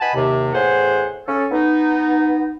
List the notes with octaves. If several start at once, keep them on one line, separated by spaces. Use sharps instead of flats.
B4 D#5 F#5 G#5 A5 B5
D#2 C3
E2 A2 G#4 C5 F#5
C#4 A4
B3 D#4